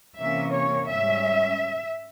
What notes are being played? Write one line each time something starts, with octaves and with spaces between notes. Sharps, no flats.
C3 E3 A#3 C#4 E5
C#5
G#2 G3 C#4 E5